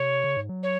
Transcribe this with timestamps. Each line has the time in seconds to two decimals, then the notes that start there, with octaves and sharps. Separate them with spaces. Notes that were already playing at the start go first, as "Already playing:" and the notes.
Already playing: C3 C#5
0.24 C#3
0.37 G#2
0.49 F#3
0.62 C#5